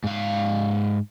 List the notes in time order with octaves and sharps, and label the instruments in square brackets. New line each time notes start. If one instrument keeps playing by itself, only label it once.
[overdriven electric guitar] G#2 F5